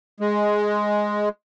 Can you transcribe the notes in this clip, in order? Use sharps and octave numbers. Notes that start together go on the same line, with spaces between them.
G#3